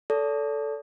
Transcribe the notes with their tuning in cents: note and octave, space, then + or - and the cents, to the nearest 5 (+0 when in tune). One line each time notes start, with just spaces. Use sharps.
A4 +0 D5 -40